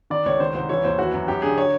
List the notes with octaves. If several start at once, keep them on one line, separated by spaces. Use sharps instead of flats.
D#3 D5
C#2 C#5
D#3 C5
C2 C5
E3 C#5
D#2 C5
E3 F#4
F#2
F#2 G4
D3 G#4
C#5